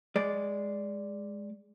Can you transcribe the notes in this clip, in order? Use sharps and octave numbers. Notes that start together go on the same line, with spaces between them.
G#3 D5